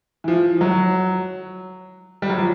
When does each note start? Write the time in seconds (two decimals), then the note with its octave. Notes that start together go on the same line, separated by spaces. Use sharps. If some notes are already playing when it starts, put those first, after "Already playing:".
0.24 E3
0.28 F3
0.61 F#3
2.22 G3
2.29 F#3
2.38 F3